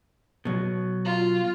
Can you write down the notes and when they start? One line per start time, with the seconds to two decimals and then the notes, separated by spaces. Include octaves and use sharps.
0.45 B2 F#3
1.05 F4